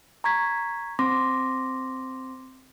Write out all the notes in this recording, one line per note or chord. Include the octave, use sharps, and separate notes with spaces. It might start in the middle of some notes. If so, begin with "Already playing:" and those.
A#5 C#6 G#6 B6
C4 C6 D6 A#6